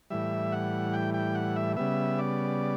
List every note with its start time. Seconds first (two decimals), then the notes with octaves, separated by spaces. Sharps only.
0.10 A2 E3 G3 E5
0.52 F#5
0.93 G5
1.14 G5
1.35 F#5
1.56 E5
1.77 C#3 G3 B3 E5
2.18 D5